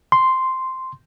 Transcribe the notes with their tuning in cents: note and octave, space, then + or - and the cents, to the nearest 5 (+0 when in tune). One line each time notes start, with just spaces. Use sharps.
C6 -5